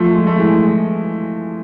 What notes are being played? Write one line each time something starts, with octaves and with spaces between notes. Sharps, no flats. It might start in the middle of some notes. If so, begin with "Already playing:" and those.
Already playing: F3 A3
G#3
A3
E3 G#3